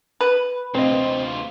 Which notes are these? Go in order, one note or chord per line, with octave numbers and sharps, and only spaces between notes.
B4
D2 C4 F4 C5 D#5